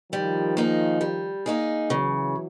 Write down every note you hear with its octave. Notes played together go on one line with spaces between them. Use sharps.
D#3 F3 G3
A#3 D#4 G#4
G3
A#3 D#4 G#4
C#3 E3 F#3